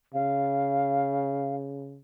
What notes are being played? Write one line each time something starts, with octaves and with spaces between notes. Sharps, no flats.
C#3 F5